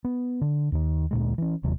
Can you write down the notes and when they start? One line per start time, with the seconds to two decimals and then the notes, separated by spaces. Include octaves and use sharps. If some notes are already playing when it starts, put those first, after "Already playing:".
0.04 B3
0.41 D3
0.72 D#2 D#3
1.11 D2 A#2 G#3
1.38 E3 C#4
1.63 F1 D#2 C3 F#3